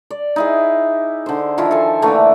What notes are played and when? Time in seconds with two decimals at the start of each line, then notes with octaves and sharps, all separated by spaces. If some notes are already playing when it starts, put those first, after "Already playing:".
0.11 D5
0.36 D#4 E4 G#4
1.26 D3 C5
1.58 D#3 F3 E4 F4
1.71 A4 G#5
2.02 D3 E3 A3 A#3